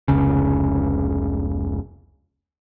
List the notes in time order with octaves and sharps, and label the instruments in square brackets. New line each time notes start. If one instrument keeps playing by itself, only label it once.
[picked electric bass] F1 C#2 C#3